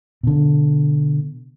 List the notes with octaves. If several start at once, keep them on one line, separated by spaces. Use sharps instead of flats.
B2 D3